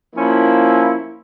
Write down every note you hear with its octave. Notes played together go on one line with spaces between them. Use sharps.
F3 A#3 C#4 E4